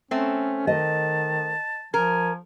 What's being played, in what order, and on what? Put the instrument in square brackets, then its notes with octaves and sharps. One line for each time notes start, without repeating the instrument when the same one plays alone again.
[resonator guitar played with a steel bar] A3 C4 [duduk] C#4
[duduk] D#3 [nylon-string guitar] D#5 [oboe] A5
[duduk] F3 [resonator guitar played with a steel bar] A#4 [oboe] G#5